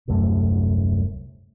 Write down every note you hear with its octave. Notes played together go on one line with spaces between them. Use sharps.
D#1 C2 F#2 A3